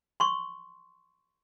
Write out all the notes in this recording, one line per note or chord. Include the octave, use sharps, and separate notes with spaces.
C6 C#6